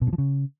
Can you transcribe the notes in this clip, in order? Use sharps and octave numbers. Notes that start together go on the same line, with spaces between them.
B2
G2
F3
C#3